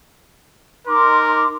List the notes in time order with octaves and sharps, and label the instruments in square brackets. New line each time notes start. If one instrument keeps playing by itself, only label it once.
[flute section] D#4 C6 D6 [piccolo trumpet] A#4